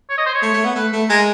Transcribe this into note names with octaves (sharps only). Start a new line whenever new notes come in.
C#5
D#5
C5
C#5
A3
A3
B3
A3 B4
A3
G#3 A#4